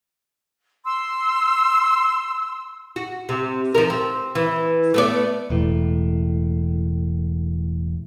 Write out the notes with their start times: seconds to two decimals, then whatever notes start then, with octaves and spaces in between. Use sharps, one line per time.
0.85 C6 E6
2.96 F#4
3.29 C3
3.75 F3 D#4 A#4
3.90 C4
4.35 E3
4.94 A3 B3 D5
5.50 E1 A2